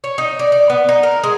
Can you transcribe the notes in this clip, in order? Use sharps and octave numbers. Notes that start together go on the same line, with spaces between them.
C#5
D#4
D5
D5
B3
D#4
A#4
G#3